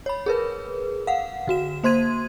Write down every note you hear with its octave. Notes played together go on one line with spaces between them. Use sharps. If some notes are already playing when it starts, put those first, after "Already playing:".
C#5 B5
G#4 A#4 B4
F5 F#5
D3 F#4 E7
A#3 C5 C6 G#6 D#7